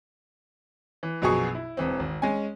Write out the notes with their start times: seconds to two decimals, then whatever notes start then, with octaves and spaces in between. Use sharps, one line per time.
1.03 E3
1.22 A#1 F#2 B2 F#3 G#4 C#6
1.55 E4
1.77 E1 E3 C4
2.00 G#1
2.22 G#3 C#4 G#5